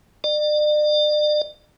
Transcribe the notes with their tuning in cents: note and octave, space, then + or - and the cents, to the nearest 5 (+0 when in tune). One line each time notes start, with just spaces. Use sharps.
D5 +40